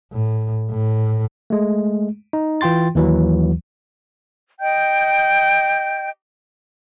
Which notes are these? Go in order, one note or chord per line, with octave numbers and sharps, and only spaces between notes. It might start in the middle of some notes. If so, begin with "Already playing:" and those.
A2
A2
G#3 A3
D#4
E3 F4 G5 C6 A6
D#2 E3 F#3
D#5 G5 G6